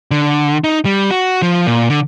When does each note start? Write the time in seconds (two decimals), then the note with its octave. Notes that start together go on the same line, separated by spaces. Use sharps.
0.11 D3
0.64 D#4
0.85 G3
1.11 F#4
1.42 F3
1.67 A#2
1.90 D3